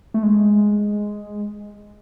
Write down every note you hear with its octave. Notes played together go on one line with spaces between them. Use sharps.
A3
G#3